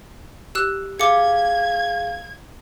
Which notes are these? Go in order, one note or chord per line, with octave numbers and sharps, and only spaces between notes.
G4 E6 F#6
G#4 F5 D6 G#6 C#7